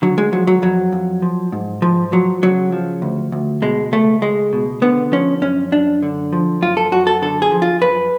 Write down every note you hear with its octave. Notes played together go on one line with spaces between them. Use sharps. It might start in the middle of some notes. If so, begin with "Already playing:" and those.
D3 F#3
G#3
F3 F#3
F#3
F2 F#3
F2
F3
G#2
G#2 F3
F3 F#3
C#3 F#3
F3
D2
D2
B2 G#3
C#2 A3
C#2 G#3
B2
D3 B3
F3 C#4
F#2 C#4
F#2 D4
D3
F3
F#2 F4
A4
F#2 F#4
A4
D3 A4
G#4
F3
F4
F#2 B4